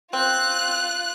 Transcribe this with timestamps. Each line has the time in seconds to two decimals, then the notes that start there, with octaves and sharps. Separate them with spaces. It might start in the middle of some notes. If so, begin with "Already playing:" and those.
0.13 C4 F4 F#6